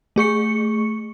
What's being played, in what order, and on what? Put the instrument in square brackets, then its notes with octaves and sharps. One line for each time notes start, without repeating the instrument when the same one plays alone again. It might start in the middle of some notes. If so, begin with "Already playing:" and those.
[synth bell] A3 G#4 C#6 C#7